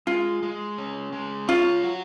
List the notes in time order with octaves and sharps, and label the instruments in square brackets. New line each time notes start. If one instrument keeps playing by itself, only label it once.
[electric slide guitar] G#3 [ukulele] F4
[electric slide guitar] G#3
C#4
G#3
[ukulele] F4 [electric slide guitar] C#5
[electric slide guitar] F#4